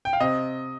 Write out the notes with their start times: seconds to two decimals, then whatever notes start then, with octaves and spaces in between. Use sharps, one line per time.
0.05 G5
0.13 F5
0.20 C3 D#5